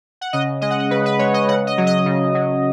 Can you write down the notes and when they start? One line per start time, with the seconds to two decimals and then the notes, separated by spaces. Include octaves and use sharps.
0.21 F#5
0.33 C#3 D#5
0.61 G#3 D#5
0.70 F#5
0.80 D#5
0.91 C#3 B4
1.06 B4
1.19 G#3 C#5
1.34 D#5
1.48 C#3 F#5
1.67 D#5
1.78 F#3
1.87 D#5
2.06 C#3
2.35 F#3